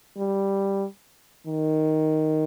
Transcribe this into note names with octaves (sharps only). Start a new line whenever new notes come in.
G3
D#3